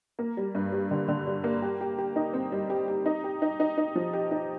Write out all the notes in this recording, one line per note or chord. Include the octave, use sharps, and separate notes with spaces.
A#3
G3
G2
G3
D3
D3
G3
A#3
G4
G4
G4
D#4
C4
G3
G4
G4
D#4
G4
D#4
D#4
D#4
F3
G4
D#4